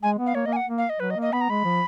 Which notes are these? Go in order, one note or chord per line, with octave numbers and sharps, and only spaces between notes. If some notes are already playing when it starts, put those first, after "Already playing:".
G#3 G#5
B3
F5
A#3 C#5
A#3 D#5
G#5
F#5
A#3
F5
D#5
F#3 B4
D#5
A#3
D#5
B3 B5
A#5
G#3 B5
F3